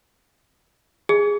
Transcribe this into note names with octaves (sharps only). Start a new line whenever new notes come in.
G#4